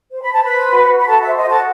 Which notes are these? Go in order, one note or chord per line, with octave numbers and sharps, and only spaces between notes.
C5
B5
C5 A5
B4 B5
C5
F#4
F#4
B5
F#4 A4 A5
E5
C5
D#5
F#4 A4 A5